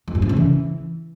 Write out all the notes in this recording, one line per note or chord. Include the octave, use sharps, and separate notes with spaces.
F2
G2
F3
C#3
E3